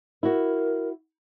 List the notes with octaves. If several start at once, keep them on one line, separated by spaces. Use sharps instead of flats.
E4 F#4 A#4